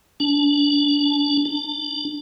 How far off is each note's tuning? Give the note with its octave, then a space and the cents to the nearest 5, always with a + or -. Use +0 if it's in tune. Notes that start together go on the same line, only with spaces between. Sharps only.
D4 -25
D4 +15